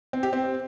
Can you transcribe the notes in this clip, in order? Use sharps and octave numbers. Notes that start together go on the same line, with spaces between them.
C4
G4
C4